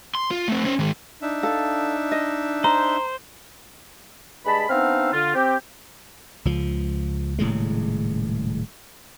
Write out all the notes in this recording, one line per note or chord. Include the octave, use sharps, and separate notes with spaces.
C6
F4
A3 C4
C#4 C5
D#3 G#3
D4 D#4 E5
A4 F5
D#5
C5 A#5
G2 G#3 A5 B5
B3 C4 D4 D#4 E5 F5
D3 F4
C4 G4
C#2 F3
D#1 A2 C#3 G#3